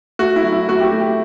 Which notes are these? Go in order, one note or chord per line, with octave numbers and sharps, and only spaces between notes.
A3 F#4
E4
F#3
E4
A3 F#4
G4
F#4
A3
G4